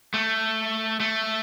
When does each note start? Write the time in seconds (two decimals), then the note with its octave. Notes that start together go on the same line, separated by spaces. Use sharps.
0.14 A3
1.00 A3